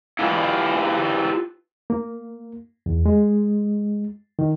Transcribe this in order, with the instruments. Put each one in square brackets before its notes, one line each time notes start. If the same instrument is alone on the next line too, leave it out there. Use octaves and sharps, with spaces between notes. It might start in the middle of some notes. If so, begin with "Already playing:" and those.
[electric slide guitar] E4 F4 G4 B4
[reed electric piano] A#3
E2
G#3
D#3